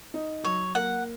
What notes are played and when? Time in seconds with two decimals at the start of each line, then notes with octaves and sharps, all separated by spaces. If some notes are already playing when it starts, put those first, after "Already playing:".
0.14 D#4
0.44 F#3 C#5
0.75 A#3 F#5